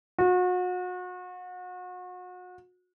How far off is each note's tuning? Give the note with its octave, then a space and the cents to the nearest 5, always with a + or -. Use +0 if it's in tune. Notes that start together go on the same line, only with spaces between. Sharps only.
F#4 -35